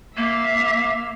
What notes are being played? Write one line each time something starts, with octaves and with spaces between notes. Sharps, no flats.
A#3 E5 F5